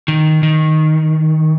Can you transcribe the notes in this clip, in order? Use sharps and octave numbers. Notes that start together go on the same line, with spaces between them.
D#3
D#3